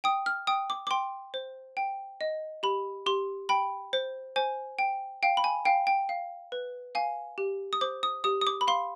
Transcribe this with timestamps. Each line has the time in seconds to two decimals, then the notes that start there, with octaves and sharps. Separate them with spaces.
0.04 G5 D#6
0.26 F6
0.47 G5 D#6
0.70 D6
0.87 D6
0.91 G5 C6
1.34 C5
1.77 G5
2.21 D#5
2.63 G4 B5
3.06 G4 C6
3.49 G5 B5
3.93 C5
4.36 C5 G#5
4.79 G5
5.23 F5 G5
5.37 B5
5.44 G#5
5.65 F5 G5
5.87 G5
6.09 F5
6.52 B4
6.95 F5 G#5
7.38 G4
7.73 D#6
7.81 C5 D6
8.03 D#6
8.24 G4 D#6
8.41 D#6
8.47 D6
8.61 B5
8.68 F5 C6